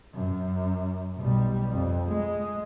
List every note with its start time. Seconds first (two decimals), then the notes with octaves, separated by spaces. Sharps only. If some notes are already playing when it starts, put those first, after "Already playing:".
0.15 F#2
1.17 B1 G3
1.71 F2
2.08 G#3